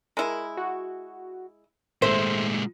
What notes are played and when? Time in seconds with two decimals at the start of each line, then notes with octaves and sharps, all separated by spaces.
0.17 G#3 E4 A#4
0.57 F#4
2.02 G#1 A#2 G#3 A3 C5 E5